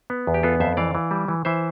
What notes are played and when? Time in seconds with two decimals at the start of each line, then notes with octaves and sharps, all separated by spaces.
0.10 B3
0.27 E2
0.34 G4
0.43 B3 F4 A4
0.60 F2 C5 E5
0.77 E3 D5 F5
0.95 E3
1.11 G3
1.28 E3
1.45 E3 C5 E5